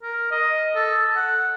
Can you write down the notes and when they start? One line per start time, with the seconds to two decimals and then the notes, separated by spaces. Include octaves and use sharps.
0.03 A#4
0.31 D#5
0.75 A4
1.16 F#5